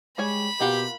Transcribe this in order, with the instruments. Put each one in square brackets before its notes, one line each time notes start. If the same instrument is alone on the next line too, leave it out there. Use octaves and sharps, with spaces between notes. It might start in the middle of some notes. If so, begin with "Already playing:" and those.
[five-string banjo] G3 C#5 G#5 [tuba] G#3 [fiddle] B5
[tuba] B2 [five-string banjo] A#3 F4 F#5 [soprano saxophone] G4